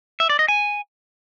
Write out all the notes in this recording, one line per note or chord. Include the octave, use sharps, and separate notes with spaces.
E5
D5
D#5
G#5